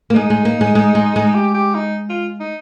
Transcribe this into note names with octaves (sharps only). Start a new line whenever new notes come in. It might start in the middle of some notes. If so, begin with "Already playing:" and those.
A#3
G#3 D#4
G#3
A#3
G#3
G#3
G#3
G#3
G4
G4
D#4
F4
D#4